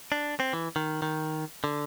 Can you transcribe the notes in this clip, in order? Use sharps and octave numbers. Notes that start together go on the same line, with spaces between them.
D4
C4
E3
D#3
D#3
D3